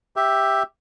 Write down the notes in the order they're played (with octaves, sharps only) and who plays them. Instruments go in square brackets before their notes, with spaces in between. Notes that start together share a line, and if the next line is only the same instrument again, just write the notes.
[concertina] G4 E5